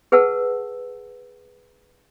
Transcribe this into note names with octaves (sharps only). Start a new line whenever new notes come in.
G#4 B4 F#5 A5 E6